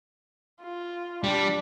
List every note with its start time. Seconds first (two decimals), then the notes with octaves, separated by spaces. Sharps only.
0.62 F4
1.24 G3 D4